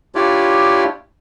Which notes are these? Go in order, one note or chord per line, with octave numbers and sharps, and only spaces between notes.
D4 E4 F4 G4 C#5 D5